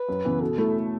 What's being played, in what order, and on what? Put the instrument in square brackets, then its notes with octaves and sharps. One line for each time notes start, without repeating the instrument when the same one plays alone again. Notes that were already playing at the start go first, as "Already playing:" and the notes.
Already playing: [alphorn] B4
[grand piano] F#2
C#3 E3 B3
[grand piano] B2 [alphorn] A4
[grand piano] A3 E4